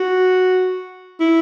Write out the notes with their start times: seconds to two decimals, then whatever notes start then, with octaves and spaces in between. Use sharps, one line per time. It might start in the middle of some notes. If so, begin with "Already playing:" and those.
Already playing: F#4
1.20 E4